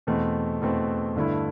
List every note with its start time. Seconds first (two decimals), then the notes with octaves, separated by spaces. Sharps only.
0.07 E2 B2 A3 C4
0.62 E2 B2 A3 C4
1.15 G2 D3 A3 E4